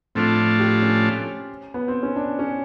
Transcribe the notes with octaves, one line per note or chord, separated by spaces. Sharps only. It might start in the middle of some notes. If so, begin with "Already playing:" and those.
A2 F3 A3 C4 D4 F4
G4
C#4
B3
C4
C#4
D4
C#4